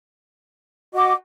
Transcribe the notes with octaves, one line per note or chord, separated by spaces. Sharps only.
F#4 D#5 F#5 D6